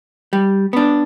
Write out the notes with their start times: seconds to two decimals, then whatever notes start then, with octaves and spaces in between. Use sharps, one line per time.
0.33 G3
0.73 B3 D4